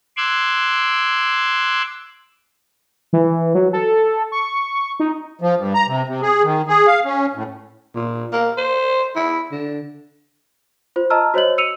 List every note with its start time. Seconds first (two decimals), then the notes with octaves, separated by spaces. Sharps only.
0.17 C6 D6 E6 F#6 G#6
3.13 E3
3.55 F#3
3.73 A4
4.32 C#6
5.00 D#4
5.42 F3
5.58 G2
5.74 A#5
5.88 C3
6.08 C3
6.22 G#4
6.43 D#3
6.68 G#4
6.87 F5
7.05 C#4
7.35 A2
7.96 A#2
8.32 A#3
8.57 C5
9.16 E4
9.52 D3
10.96 F4 C5
11.10 D#5 A5 A#5 E6 F6
11.34 F#4 C5 C#5 D#5 F#7
11.58 E6 C#7 D#7 F7